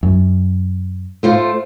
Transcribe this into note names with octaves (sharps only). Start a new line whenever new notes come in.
F#2
A3 F4 C5